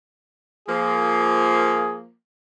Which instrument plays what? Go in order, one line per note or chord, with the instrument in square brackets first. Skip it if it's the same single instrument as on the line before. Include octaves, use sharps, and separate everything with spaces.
[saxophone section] F3 A#3 [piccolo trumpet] G#4